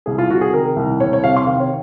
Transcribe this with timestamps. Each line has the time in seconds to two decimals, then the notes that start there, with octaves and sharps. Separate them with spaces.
0.06 C2 G#4
0.18 F4
0.29 C3 F#4
0.41 G#4
0.54 D#3 A#4
0.76 C2
1.00 C2 C#5
1.13 C#5
1.24 C3 F5
1.37 C6
1.47 D#3 F5
1.60 C#5